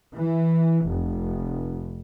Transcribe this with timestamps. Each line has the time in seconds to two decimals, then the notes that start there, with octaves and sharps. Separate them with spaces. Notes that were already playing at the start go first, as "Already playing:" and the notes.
0.15 E3
0.87 F1